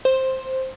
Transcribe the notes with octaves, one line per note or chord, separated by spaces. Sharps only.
C5